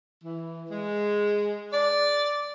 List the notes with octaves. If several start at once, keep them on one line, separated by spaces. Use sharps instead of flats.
E3
G#3
D5